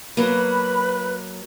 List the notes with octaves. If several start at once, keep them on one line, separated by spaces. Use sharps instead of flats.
F#3 A#3 B4 B5